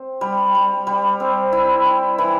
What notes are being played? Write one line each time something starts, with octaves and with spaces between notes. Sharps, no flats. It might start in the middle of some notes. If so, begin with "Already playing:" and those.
Already playing: C4
G3
G3
G3
C4
E4
E4
E3